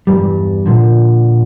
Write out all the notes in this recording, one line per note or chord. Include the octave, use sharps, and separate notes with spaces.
E2 G2 G3
A#2 D3 F3